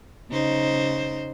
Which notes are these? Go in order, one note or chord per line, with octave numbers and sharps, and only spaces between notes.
C#3 D#4 C5